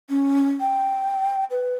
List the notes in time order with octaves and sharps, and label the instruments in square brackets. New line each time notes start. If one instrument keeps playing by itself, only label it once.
[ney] C#4
G5
B4